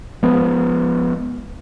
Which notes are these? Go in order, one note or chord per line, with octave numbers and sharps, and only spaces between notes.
F3 G#3 B3